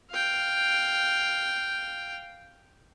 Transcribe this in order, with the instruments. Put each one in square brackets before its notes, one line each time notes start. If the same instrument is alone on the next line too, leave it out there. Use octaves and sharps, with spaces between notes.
[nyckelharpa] F5 G5